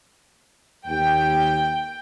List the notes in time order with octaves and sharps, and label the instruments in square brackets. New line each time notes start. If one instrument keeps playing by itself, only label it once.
[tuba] D#2 [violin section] G5